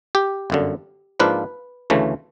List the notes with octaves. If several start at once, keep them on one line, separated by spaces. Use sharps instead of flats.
G4
G1 F#2 D3
G#2 F3 A#3 D4 F4 B4
D2 C#3 E3 A3